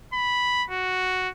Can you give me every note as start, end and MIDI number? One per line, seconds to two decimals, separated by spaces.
0.13 0.64 83
0.70 1.29 66